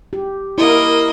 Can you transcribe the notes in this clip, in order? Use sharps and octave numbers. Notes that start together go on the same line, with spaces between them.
G4
A#3 E4 A#4 D#5